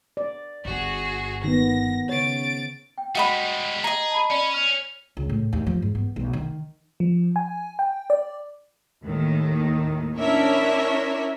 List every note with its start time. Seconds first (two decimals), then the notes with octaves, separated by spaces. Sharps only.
0.17 D5
0.65 G1 G2 F#4 G#4
1.44 D#3 B3 A#6
2.09 C#3 C#5 A6 D7
2.98 G5
3.15 G3 G#3 F#4 D#5 B5
3.84 G#4 D#5 A#5
4.11 A5 B5
4.30 C#4 D5 B5
4.54 F6 F7
5.17 C#2
5.29 A2
5.53 D#2
5.67 F3
5.82 G#2
5.95 B3
6.16 B1
6.33 D#3
7.00 F3
7.36 G#5
7.79 G5
8.10 D5
9.05 D#2 A2 D#3
10.18 C#4 D4 E4 A#4 C#5 E5